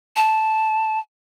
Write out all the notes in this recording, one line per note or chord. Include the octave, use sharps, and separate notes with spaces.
A5